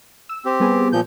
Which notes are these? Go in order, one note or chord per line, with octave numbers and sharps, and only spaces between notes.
E6
C4 G4
G3 B3 G#4
A#2 F3 G6